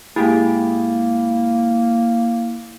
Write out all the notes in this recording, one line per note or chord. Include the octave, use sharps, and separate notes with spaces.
G#2 A#3 E4 G4 G#4